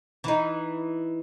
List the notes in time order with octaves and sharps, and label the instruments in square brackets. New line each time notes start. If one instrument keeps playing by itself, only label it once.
[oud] E3 D#4